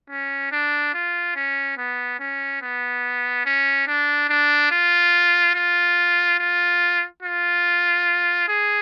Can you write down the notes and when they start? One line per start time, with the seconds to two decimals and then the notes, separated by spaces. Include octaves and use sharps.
0.10 C#4
0.52 D4
0.94 F4
1.36 C#4
1.78 B3
2.19 C#4
2.62 B3
3.45 C#4
3.88 D4
4.29 D4
4.71 F4
5.55 F4
6.39 F4
7.23 F4
8.48 G#4